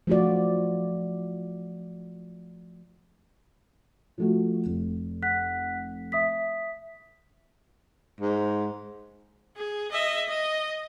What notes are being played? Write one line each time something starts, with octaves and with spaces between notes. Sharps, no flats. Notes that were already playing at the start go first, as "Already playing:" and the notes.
F3 A3 F4 F#4 D5
F3 A3 F#4
F1
F#5 F#6 B6
E5 D#6 B6
G#2
G#4
D#5 E5
D#5